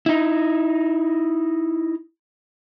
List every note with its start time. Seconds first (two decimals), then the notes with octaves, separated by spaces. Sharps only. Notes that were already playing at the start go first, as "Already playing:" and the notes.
0.06 D#4 E4